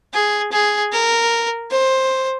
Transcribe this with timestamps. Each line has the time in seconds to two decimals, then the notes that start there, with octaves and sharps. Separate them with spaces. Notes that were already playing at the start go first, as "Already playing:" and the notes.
0.14 G#4
0.52 G#4
0.92 A#4
1.71 C5